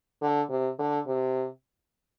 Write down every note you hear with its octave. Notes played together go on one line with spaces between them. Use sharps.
D3
C3
D3
C3